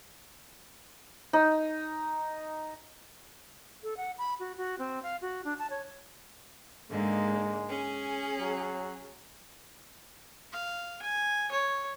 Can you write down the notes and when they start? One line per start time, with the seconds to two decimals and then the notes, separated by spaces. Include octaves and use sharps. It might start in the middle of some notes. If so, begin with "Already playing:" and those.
1.33 D#4
3.83 A4
3.97 F#5
4.18 B5
4.39 F#4
4.57 F#4
4.79 C4
5.03 F5
5.22 F#4
5.45 D4
5.59 A5
5.70 C#5
6.90 G#2 D3 G#3 A#3
7.68 C#4 G#4
8.40 F#3
10.52 F5
11.02 G#5
11.51 C#5